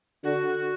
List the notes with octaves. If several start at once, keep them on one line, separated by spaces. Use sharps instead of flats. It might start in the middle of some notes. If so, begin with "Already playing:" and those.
D3 D4 F#4